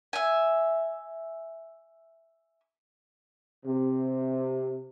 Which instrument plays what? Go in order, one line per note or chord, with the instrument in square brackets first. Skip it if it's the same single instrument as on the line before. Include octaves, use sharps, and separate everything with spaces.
[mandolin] E5 G#5
[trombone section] C3